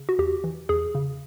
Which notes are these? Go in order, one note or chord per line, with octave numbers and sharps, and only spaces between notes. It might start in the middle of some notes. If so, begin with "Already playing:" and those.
Already playing: C#3
F#4
E2 G4
E3
E2 G#4
C#3